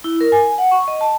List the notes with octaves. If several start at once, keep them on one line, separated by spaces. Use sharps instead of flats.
E4
A#4
G#5
F#5
C#6
D#5
A5